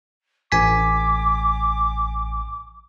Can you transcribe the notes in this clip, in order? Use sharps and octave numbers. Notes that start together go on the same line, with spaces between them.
A1 G#5 D6 B6